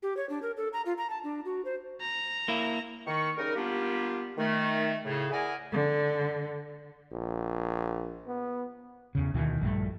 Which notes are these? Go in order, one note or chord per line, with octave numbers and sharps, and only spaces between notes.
G4
C#5
D4
A#4
A4
A#5
F4
A#5
A5
D4
F#4
C5
A#5
A#3 E4
D#3 C#6
C#3 G3 D#4 A#4
G3 A#3 B3 D4 F4 G4
D#3 A3
A2 C#3
E4 G#4 A#4 D5 F#5 G#5
D3
A#1
B3
E2 C#3
D2 B2 D#3 E3
A#1 G2 A3